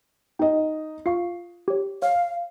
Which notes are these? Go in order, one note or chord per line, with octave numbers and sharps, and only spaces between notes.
D#4 D#5 G5
F4 F5 C#6 C7
G4 C#5
C#5 F5 F6